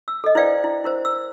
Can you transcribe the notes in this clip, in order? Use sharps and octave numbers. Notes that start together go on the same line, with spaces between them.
E6
A4 D#5
E4 B4 C5 D5 F5 G5
E4
E4 A#4 C5
E6